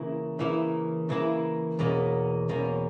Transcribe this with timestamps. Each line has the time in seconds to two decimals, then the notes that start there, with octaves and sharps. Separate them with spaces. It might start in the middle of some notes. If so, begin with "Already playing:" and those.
Already playing: C#3 E3 A#3 E4
0.39 C#3 E3 A#3 E4
1.09 C#3 E3 A#3 E4
1.79 E2 B2 A#3 C#4
2.49 E2 B2 A#3 C#4